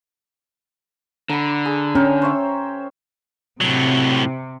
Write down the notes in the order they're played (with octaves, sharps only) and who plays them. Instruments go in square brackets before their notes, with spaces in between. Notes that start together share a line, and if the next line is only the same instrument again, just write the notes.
[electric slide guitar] D3 [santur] A#5 B5
[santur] G#4
[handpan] C#4 [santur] A#4 G5
[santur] C5 C#5 E5
[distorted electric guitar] A2 F#3 [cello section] C3